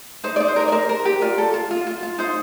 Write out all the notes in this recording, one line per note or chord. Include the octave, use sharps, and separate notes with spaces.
D#4 C5
D5
D#4
C5
A#4 D5
D5
A#4 C5
A#4
G4
F4 D5
A4
F4
F4
F4
F4
D#4 C5